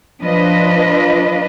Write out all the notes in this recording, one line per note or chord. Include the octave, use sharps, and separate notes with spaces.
F3 D4 F4 B4 D#5